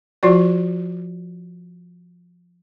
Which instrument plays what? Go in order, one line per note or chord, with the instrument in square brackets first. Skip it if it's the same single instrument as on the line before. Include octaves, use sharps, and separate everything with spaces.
[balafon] F3 F4 F#4 D5